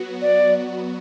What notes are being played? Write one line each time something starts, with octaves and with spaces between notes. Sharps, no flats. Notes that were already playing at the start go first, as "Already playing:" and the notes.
Already playing: F#3 B3 F#4
D5